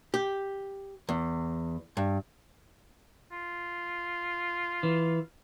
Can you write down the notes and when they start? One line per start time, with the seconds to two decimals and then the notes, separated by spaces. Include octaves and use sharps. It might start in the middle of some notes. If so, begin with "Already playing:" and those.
0.14 G4
1.09 E2
1.97 G2
3.32 F4
4.83 E3